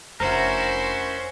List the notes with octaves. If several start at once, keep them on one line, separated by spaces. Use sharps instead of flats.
F1 C#4 D4 E4 F#4 A#4 C5